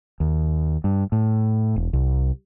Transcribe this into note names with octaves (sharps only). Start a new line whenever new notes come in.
D#2
G2
A2
E1
C2